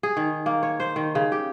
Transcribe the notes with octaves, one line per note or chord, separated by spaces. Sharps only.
G#4
D#3
A#3
C#5
C5
D#3
C#3
G4